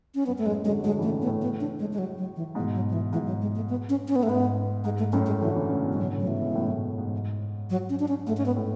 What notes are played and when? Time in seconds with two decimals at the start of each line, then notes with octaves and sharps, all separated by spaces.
0.15 C#4
0.26 F#2 B3
0.38 A3
0.45 F#2 A2 G#3
0.65 D3 F#3 G#3
0.84 D3 F#3 G#3
0.98 C#3 E3
1.02 A3
1.12 A2 C#3
1.22 B3
1.26 A2 C#3
1.42 B3
1.60 D4
1.79 G#3
1.93 G#3
1.98 F#3
2.18 F#3
2.36 E3
2.55 G#2 B2 E3
2.74 F#3
2.89 F#3
2.93 E3
3.13 G#2 E3
3.27 F#3
3.42 G#3
3.56 A3
3.69 B3
3.89 C#4
4.08 C#4
4.16 B3
4.23 A3
4.27 G#2 B3
4.84 G#2 G#3
4.99 A3
5.13 F#2 A2 C#4
5.26 G#3
5.41 D3 E3 F#3
5.55 C#3 E3
5.69 A2 C#3
5.84 G#2 B2
5.92 G#3
5.98 B2 D3 F#3
6.13 A2 C#3
6.19 F#3
6.27 G#2 B2 E3
6.42 G#2 B2
6.55 F#2 A2
6.70 F#2 A2
6.98 G#2
7.70 F#3
7.90 C#4
8.00 D4
8.08 C#4
8.27 G#2 A3
8.37 C#4
8.46 B3
8.56 A2